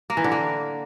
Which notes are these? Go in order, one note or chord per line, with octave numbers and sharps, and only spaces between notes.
A#3
E3
D3
A#3